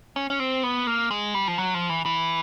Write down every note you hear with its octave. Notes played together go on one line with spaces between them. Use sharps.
C#4
C#4
C4
B3
A#3
G#3
G3
F3
F#3
F3
E3
E3